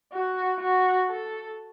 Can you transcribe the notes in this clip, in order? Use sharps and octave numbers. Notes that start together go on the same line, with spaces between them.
F#4
F#4
A4